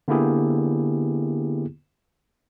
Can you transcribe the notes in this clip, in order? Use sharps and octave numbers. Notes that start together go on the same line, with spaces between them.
D3 A#3 B3 E4 G4 G#4